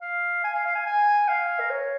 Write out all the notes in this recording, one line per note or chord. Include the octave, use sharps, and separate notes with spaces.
F5
G#5
F5
F5
G#5
G#5
F5
A#4
C#5